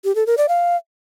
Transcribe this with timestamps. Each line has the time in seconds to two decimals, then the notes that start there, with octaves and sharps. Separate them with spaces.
0.04 G4
0.15 A4
0.26 A#4
0.38 D5
0.49 F5